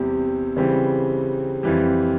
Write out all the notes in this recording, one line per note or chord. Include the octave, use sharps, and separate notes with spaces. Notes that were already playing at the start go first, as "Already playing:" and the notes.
Already playing: E2 C3 G3
C#3 E3 G3 C4
F2 E3 G3